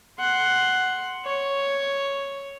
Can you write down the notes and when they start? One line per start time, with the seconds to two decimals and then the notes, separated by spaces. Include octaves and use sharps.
0.20 F#5 C6
1.26 C#5